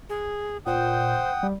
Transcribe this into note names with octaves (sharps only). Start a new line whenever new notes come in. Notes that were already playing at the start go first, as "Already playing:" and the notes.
G#4
A#2 C5 F#5 G5 D#6
G3